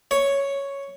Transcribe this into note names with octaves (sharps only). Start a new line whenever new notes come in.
C#5